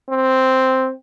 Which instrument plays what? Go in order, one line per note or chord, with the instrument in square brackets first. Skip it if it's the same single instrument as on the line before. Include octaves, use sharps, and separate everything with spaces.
[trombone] C4